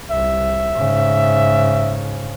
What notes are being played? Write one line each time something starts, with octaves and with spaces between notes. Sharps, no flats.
C2 E5
G#2 C#3